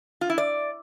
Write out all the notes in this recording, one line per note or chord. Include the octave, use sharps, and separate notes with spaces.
F4
E4
D5